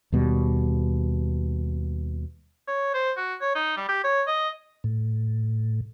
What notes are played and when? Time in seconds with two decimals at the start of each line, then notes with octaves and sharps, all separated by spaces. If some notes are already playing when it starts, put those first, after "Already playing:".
0.12 D#2 B2 G3
2.68 C#5
2.94 C5
3.17 F#4
3.41 C#5
3.55 D#4
3.77 G3
3.89 G4
4.04 C#5
4.27 D#5
4.84 A2